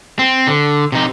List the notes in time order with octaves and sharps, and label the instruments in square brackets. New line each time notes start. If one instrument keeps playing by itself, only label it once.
[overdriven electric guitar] C4
D3
C3 D#4